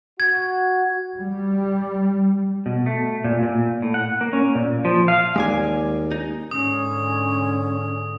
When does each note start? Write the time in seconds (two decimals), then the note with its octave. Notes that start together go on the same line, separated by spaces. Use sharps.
0.20 F#4 G#6
1.16 G3
2.66 B2
2.86 A3
3.24 A#2
3.43 A#2
3.82 A2
3.94 F#5
4.21 A#3
4.33 C#4
4.55 A#2
4.85 F3
5.08 F5
5.36 D#2 G#3 D5 G#5
6.12 D#4
6.51 G#2 D3 C#4 D#6